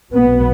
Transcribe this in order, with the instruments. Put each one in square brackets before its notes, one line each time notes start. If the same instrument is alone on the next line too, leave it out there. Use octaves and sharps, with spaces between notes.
[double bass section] B1 B2 B3